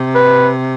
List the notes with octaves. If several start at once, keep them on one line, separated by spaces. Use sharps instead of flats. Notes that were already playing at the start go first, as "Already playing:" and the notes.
Already playing: C3
B4